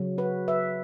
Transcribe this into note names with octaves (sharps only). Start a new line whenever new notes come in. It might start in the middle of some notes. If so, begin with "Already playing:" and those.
Already playing: C#3 F#3
F#4 B4
B4 E5